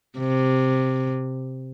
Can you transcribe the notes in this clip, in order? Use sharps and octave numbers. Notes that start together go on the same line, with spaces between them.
C3